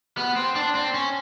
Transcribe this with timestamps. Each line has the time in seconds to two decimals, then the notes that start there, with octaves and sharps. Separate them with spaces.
0.17 B3
0.36 C4
0.55 D4
0.75 C4
0.94 C#4